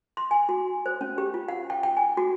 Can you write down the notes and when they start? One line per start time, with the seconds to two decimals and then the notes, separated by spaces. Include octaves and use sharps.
0.17 C6
0.31 G#5
0.49 F#4
0.86 C5
1.01 C#4
1.18 G4
1.34 F4
1.48 F#5
1.70 G5
1.83 G5
1.97 G#5
2.17 F#4